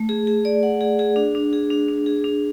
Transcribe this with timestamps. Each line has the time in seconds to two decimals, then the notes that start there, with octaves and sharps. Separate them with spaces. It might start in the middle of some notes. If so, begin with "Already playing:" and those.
Already playing: A3
0.09 G#4
0.27 G#4
0.45 D5
0.63 F#5
0.81 G#4
0.99 G#4
1.16 D4
1.35 D4
1.53 G#4
1.70 D4
1.88 D4
2.06 G#4
2.24 D4